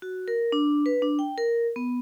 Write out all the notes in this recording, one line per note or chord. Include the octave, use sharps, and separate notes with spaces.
F#4
A#4
D4
B4
D4
G5
A#4
B3